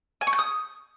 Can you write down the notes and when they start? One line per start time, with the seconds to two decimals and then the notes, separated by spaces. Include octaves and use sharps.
0.21 G#5
0.27 C#6
0.33 G6
0.38 D#6